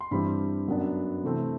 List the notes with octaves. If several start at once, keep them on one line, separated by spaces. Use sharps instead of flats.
C6
G2 E3 G3 C4 B5
F#2 F#3 B3 D4
C3 E3 A3 C4